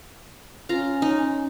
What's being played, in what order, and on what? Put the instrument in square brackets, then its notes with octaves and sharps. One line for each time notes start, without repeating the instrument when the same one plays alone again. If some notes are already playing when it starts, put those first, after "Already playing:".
[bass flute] C#4 [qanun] F4 A#5
[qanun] D#4